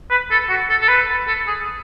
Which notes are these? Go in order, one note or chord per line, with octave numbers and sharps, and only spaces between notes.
B4
A4
F#4
A4
A4
B4
A4
G#4